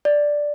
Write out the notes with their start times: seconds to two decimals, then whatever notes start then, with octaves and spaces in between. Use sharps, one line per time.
0.05 D5